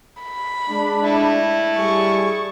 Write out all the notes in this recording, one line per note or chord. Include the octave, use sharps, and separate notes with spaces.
B5
G#3 D4
E4 A5
G3 G#4 C#6